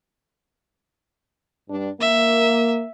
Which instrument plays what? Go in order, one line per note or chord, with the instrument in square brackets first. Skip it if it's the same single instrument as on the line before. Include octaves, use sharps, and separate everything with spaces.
[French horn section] G2 D4
[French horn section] A#3 [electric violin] E5